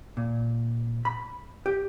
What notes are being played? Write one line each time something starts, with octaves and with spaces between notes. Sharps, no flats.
A#2
B5
G4